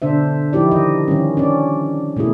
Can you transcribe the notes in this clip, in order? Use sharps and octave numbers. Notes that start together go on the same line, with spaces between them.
B2 D3 D4 C5 E5
F3 D#4 E4 G4 D5
D#3 D#5
D#3 G3 C#4
C#4 D4 D5
B2 A3 A#3 E4 G#4